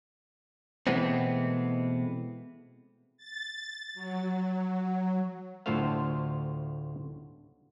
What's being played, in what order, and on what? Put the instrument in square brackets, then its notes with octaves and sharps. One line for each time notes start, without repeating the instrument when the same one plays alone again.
[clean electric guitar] B2 E3 G#3 A3 B3 C4
[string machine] A6
F#3
[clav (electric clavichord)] D2 A2 F4 A4 C5 F5